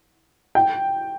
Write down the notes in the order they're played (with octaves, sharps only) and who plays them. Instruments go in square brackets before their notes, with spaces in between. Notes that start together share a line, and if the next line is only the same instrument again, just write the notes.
[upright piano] G5